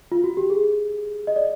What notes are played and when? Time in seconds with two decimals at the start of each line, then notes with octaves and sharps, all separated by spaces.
0.12 F4
0.24 F#4
0.37 G4
0.50 G#4
1.27 D#5
1.36 D5